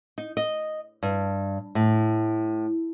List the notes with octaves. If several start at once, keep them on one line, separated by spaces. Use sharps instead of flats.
D#4
D#5
G2
A2